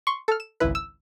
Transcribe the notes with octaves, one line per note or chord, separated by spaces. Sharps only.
C6 C#6
A4 F6
E7
G#1 C#2 E4 B4
E6